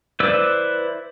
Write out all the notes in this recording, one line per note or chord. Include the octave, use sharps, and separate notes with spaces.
E4 B4 C5 D5 E6